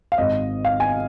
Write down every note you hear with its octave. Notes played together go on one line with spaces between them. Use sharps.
F5
G#1 G#2 G#3 D#5
F5
G#5